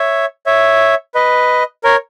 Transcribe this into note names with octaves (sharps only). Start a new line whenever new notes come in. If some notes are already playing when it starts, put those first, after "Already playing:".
Already playing: C#5 E5
C#5 E5
B4 D#5
A#4 C#5